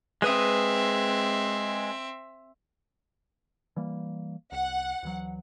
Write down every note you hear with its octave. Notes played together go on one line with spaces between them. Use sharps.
G#3 C4 B4 E5 D#6
E3 G3 A#3
C2 F#5
D2 E3 F#3